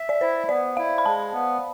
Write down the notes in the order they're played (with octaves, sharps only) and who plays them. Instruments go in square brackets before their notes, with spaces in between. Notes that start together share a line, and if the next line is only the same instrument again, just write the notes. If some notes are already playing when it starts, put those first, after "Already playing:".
Already playing: [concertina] E5
[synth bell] D5
[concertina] E4 [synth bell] C5
[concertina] B3 [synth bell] D5
[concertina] E4 [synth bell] F5
[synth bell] B5
[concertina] G#3 [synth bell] A5
[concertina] B3